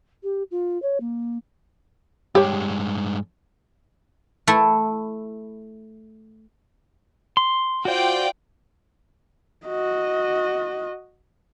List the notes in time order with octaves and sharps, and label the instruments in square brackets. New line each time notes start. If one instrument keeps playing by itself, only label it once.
[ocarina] G4
F4
C#5
A#3
[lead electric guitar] G2 G#3 [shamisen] G4 C#5
[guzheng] A3 E4
[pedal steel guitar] C6
[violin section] F4 D5 G5 [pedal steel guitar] F#4 C5
[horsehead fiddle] F#4 D#5